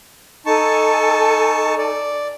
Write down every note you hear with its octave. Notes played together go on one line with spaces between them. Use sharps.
D#4 A4 G#5 A5 C#6
D5